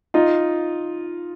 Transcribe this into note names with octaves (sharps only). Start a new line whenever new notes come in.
D#4 F4